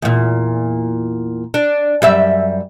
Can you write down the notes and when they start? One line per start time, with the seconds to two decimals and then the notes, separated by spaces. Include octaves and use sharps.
0.02 E2 A#2
1.54 D4
2.02 F#2 G3 E5